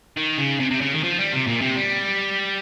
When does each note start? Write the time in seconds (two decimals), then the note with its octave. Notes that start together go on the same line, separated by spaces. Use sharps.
0.17 D#3
0.38 C#3
0.60 C3
0.71 C3
0.81 C#3
0.93 D#3
1.04 F3
1.19 G3
1.33 C3
1.47 A#2
1.61 C3
1.77 G3